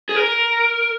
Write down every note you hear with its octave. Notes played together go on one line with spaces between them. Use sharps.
G#4
A#4